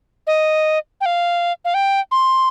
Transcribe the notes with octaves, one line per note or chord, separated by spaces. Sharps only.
D#5
G5
F5
F5
G5
C6